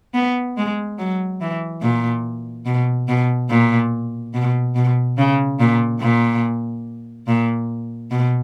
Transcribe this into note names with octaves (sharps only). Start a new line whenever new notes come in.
B3
G#3
F#3
E3
A#2
B2
B2
A#2
B2
B2
C#3
A#2
A#2
A#2
B2